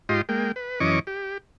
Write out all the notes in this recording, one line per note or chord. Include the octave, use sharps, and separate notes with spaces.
G#2 F4 G4 D#5 C6
G#3 A#3 G5
B4
F#2 E3 C#4 D#5 C#6 D6
G4